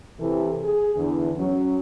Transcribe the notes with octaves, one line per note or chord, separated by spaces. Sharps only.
C3 E3 A4
G#4
E2 D3
F#3 C#4